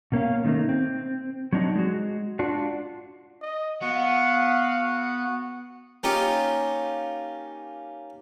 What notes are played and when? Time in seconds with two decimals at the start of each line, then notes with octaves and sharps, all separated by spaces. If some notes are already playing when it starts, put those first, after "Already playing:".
0.12 B2 A#3 C#4 F5
0.45 D#3 G3 A3 A#3 D#4
0.69 C4
1.53 F#3 C4 D4 D#4 F#4
1.76 G#3 F#4
2.39 D4 F4 F#4
3.42 D#5
3.82 B3 F#4 F5 F#5
6.03 A#3 C#4 D#4 F4 G4